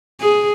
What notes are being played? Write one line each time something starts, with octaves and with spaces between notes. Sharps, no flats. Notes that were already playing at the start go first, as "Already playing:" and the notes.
G#4